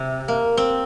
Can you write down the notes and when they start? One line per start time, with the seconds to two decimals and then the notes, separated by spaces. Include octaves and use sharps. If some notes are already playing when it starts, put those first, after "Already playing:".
Already playing: C3
0.28 A#3
0.57 C4